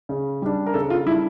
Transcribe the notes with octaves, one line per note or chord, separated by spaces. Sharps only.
C#3
G3 D4
A#4
C#3 A4
F4
G3 D4 E4